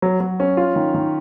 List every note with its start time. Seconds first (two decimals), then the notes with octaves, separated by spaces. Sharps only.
0.02 F#3
0.20 F#3
0.40 C#4
0.57 F4
0.76 D#3
0.94 D#3